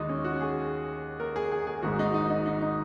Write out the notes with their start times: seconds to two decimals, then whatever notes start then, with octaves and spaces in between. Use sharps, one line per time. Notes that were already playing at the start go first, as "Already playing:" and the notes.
Already playing: D#2 D#3 G#3 D#4 F#4
0.09 C#4
0.25 F#4
0.41 G#4
1.20 A#4
1.36 G#4
1.52 G#4
1.67 G#4
1.83 G#1 G#2 G#3 F#4
1.99 D#4
2.14 D#4
2.30 D#4
2.46 D#4
2.62 D#4